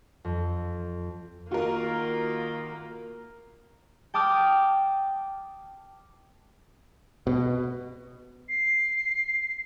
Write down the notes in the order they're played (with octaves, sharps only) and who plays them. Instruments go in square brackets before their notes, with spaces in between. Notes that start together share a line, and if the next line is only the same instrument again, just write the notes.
[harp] F2
[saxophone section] D#3 F4 [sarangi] A#3 [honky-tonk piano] F#4 A#4
[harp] G5 A5 D6 D#6 F6
[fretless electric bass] B2
[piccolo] C7